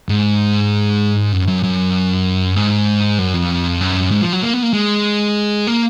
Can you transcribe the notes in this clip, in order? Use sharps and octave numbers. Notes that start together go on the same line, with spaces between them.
G#2
F#2
F#2
F#2
G#2
F#2
F2
F#2
G#2
F3
F#3
A#3
B3
A#3
G#3
A#3